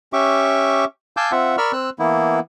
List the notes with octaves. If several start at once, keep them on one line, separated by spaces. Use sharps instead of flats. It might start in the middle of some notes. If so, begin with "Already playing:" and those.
C#4 G4 E5 C#6 D6
F5 G#5 A5 D6 E6 G6
C4 F4 E5 F#5
A#4 D5 B5 C#6 E6 F6
C4 E6 F#6
E3 A#3 B3 E4